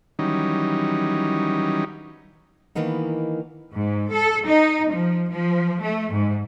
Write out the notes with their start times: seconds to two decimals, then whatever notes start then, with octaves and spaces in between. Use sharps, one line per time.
0.19 D#3 E3 F#3 G3 C#4 D#4
2.75 D#3 E3 A#3 B3 D#4
3.75 G#2
4.12 A4
4.45 D#4
4.92 F3
5.30 F3
5.83 A3
6.13 G#2